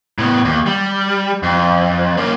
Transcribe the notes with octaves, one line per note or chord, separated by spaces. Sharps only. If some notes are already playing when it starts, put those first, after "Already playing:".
A2 B3
D#2
G3
F2
A#3 C#4